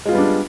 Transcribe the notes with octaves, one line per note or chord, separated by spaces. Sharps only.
G3 G#3 B3 D4 F4